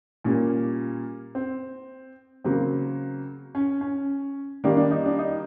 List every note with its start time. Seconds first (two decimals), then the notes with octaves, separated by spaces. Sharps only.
0.24 A#2 G3 A#3 C#4
1.35 C4
2.44 C#3 F#3 A#3 C4
3.55 C#4
3.81 C#4
4.64 D#3 G3 A#3 D4
4.77 D4
4.91 D#4
5.06 D4
5.19 D#4